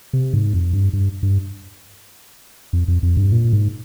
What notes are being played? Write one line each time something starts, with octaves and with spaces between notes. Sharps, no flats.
C3
G#2
F2
G2
G2
G2
F2
F2
F2
G2
A#2
G#2